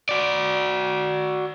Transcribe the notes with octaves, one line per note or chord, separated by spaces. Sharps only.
F#4 D5